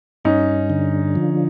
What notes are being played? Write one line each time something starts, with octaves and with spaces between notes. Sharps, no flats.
G2 C#4 D#4
D3
F3